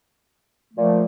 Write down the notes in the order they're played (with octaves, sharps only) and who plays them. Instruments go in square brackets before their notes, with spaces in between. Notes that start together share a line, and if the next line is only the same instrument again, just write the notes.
[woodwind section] A#2 F3 A3